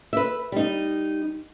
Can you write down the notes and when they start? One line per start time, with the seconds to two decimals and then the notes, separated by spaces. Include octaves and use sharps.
0.13 B4 E5
0.52 G3 D#4